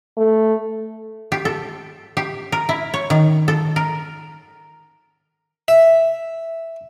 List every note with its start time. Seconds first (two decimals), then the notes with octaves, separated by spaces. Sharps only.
0.18 A3
1.32 G4
1.45 A4
2.17 G4
2.52 A#4
2.69 E4
2.94 C#5
3.10 D#3
3.48 A4
3.76 A#4
5.68 E5